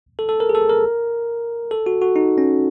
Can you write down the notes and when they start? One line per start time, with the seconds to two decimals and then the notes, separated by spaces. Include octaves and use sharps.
0.19 A4
0.29 A4
0.40 A#4
0.49 G#4
0.55 A4
0.69 A#4
1.71 A4
1.86 F#4
2.02 F#4
2.16 D#4
2.38 C#4